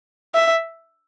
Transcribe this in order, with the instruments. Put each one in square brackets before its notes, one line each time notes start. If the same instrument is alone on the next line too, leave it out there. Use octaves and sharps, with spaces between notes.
[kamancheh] E5